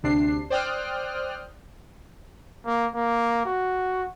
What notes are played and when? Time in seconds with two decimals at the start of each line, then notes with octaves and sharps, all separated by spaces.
0.03 D2 C3 D4 C7
0.50 C5 D5 G5 D#6 F6 F#6
2.66 A#3
2.95 A#3
3.45 F#4